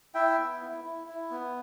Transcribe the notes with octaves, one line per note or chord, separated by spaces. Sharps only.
E4 E5 G5
B3
E4
E4
E4
B3